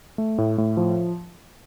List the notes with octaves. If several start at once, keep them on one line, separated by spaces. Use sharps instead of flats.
A3
A2
A2
F3